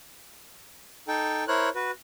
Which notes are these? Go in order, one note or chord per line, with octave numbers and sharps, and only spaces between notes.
D#4 A4 G5
E4 A#4 C5 C#5 F#6
F#4 B4